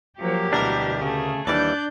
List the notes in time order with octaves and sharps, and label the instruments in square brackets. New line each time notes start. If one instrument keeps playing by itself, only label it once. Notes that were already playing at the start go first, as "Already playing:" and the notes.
[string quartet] F3 F#3 A#3 [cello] G4
[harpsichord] D2 A#4 [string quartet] B2 [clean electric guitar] E3 G3 D4
[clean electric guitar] C#3 [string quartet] A3 G#4
[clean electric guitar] D#2 E3 G3 [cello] D4 [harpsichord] D5 [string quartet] F#6 G6